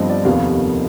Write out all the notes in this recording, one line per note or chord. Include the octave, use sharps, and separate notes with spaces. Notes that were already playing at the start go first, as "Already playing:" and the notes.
Already playing: G1 G2 F3 C4 D#5
D5
F1 D#2 D#3 G3 B3 F5